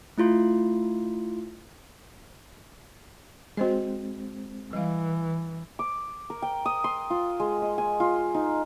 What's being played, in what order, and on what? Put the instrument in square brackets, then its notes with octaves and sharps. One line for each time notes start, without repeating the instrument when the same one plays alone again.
[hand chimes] A3 E4 F4 C6
[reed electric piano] G#3 C4 [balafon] F#4 C5 D#5
[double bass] E3 [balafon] G3 F5
[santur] D6
A#4
G5
D#6
C6
F4
G#3
D#5
G#5
F4
D#4